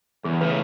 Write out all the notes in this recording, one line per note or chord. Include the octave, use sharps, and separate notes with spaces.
E2 G#4
C#3 E3 A3 B4